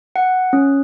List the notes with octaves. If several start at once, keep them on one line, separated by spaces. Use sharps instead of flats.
F#5
C#4